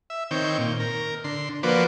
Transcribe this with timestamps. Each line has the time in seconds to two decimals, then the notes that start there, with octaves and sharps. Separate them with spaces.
0.10 E5
0.31 D#3 C4 C#5 G5
0.58 A#2
0.80 A#4
1.24 D3 C6
1.63 F3 A#3 F#4 B4 C5 D5